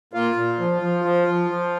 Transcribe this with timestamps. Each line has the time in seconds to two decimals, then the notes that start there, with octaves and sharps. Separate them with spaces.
0.13 A#2 F4
0.36 A#2
0.59 F3
0.81 F3
1.05 F3
1.27 F3
1.50 F3